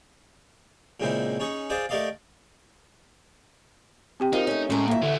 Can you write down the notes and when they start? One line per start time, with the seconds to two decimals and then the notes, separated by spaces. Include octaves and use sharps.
1.00 A#2 C#3 G#3 C4 D#4 E4
1.40 C#4 D#4 G#4 C#5
1.70 F4 G#4 C5 D5 D#5
1.89 A3 G4 A#4 D5 D#5 F5
4.20 C4 G4 G5
4.33 F3 D#4 A#4
4.47 A3 C#4
4.70 A2 G#3 C#4 A#5
4.88 D2 A#3 E5
5.02 D3 E3 A3